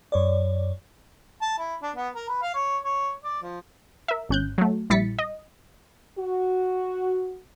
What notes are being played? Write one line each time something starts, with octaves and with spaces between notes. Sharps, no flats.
F#2 C#5 D5
A5
E4
D4
B3
A#4
B4
F5
C#5
C#5
D5
F3
A#4 E5
G#1 C#4 F#6 G6
F#3 A3
A#1 G3 E4 A6 B6 C#7
D#5
F#4